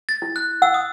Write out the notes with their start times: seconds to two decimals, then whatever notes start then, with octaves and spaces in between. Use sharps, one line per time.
0.09 A6
0.22 E4
0.36 F#6
0.62 F#5 E6
0.74 D#6